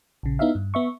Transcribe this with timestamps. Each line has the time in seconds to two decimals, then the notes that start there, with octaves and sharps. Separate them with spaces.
0.23 A#1 C#3
0.39 B3 D#4 E4 E5 F5
0.55 G2
0.74 B3 E5 C#6